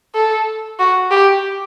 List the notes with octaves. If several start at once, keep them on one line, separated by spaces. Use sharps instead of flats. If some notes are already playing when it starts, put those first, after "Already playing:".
A4
F#4
G4